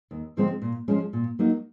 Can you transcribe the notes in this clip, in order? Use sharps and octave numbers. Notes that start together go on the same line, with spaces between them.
D#2
D3 F3 G#3 C4
A#2
F3 G#3 C#4
A#2
F#3 A#3 D#4